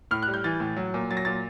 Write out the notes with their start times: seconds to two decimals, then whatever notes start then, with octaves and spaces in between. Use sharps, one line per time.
0.11 A2 F6
0.23 G3 F#6
0.34 G6
0.44 E3 A6
0.60 A2
0.76 F#3
0.94 A#2
1.11 F#3 A6
1.17 A#6
1.25 A#2 A6